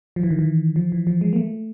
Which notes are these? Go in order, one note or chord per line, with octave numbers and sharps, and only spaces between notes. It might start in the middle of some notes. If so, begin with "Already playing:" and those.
F3
E3
D#3
E3
F3
E3
F3
G#3
A#3
A3